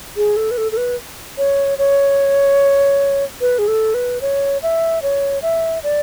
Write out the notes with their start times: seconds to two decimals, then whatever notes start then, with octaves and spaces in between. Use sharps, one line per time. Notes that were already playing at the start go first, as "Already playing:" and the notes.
0.17 G#4
0.37 A4
0.51 B4
0.58 A4
0.72 A4
0.77 B4
1.38 C#5
1.78 C#5
3.41 B4
3.59 G#4
3.68 A4
3.94 B4
4.21 C#5
4.63 E5
5.02 C#5
5.42 E5
5.83 D5